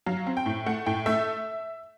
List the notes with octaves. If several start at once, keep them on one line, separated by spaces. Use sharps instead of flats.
F#3 F5
C4
G5
A2
A3 F#5
A2 G5
A3 E5